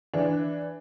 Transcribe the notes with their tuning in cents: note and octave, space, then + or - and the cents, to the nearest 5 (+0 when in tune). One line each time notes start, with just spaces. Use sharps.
E3 +0 D4 +0